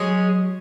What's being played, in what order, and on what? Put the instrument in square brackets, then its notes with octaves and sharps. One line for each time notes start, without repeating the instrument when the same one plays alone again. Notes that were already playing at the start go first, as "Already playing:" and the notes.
Already playing: [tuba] F#3 [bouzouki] G#3 C#4 G#4